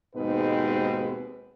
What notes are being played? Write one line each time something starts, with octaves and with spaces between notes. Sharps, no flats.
D#2 G#2 B2 G#3 C4 B4